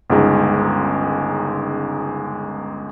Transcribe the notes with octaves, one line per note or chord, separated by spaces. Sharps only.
G1 C#2 G#3 D#4